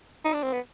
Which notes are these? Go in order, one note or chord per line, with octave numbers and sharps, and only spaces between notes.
D#4
D4
C4
B3